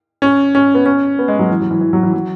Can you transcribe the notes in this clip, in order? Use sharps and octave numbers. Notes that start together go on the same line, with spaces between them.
C#4
C#4
B3
C#4
B3
G#3
F#3
E3
F#3
E3
E3
F#3
E3
F#3